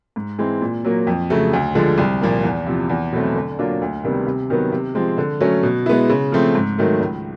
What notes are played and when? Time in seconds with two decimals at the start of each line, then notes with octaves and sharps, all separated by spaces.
0.16 G#2
0.38 E3 G#3 C4
0.61 A#2
0.84 F#3 A#3
1.07 F2
1.30 C#3 F#3 A3
1.53 D2
1.75 D3 F3 G#3
1.98 C2
2.21 A#2 F3 A#3
2.44 E2
2.66 C3 F3
2.89 E2
3.12 B2 F#3 A3 C4
3.35 D3
3.59 F#3 A#3 D4 F4
3.82 D2
4.03 C3 D#3 G3 B3
4.27 C3
4.50 D#3 F#3 B3
4.72 C3
4.95 F3 G#3 C4
5.18 D3
5.40 F#3 A3 C#4
5.63 B2
5.86 G#3 B3 E4
6.09 C#3
6.32 F3 A3 C4
6.55 G#2
6.78 D#3 F#3 A3
7.00 C#2